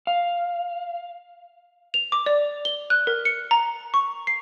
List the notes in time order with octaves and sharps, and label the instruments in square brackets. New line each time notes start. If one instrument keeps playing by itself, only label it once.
[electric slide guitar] F5
[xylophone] F7
D6
D5
G7
F#6
A#4
C#7
A#5
C#6
C7